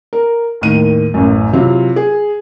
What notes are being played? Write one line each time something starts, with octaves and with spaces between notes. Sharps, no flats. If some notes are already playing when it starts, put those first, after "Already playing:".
A#4
D#2 A2 D#3 D#7
A1 F#2
C3 F#3 E4 F4
G#4